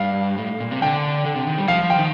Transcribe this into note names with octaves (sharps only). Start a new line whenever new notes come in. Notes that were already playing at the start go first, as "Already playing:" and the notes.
Already playing: G2 F5
A2
A#2
C3
D3 G5
D3
C3
D#3
G3
F3 F5
F3
G5
D#3